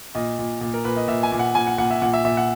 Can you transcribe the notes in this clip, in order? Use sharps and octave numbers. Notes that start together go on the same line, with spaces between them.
A#2 D#5
A#2
A#2
A#4
A#2 B4
D#5
A#2 E5
G#5
A#2
F#5
A#2 G#5
F#5
A#2 F#5
E5
A#2 F#5
E5
A#2 E5
F#5